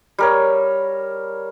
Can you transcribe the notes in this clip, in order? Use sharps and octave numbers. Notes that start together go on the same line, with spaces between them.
G3 A#4 C#5